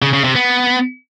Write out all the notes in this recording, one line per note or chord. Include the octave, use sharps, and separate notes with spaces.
C#3
C#3
C3
B3